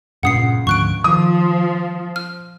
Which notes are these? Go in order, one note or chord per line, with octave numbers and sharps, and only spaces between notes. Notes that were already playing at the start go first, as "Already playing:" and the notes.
C#2 G2 A#2 F#5 D#6 C7
D2 G#2 F3 C#6 F#6 D7
D#3 F3 D#6
F6